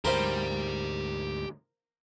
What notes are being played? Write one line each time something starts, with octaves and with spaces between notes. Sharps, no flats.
D2 G#2 G4 A#4 C5 F5 B5